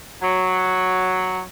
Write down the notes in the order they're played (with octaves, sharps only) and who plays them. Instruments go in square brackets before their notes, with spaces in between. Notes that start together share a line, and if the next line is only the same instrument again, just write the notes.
[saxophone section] F#3